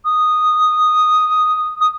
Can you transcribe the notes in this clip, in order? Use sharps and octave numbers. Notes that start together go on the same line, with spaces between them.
D#6
D#6